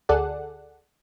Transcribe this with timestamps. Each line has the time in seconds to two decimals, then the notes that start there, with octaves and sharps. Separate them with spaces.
0.09 D2 G#4 A4 D5 F#5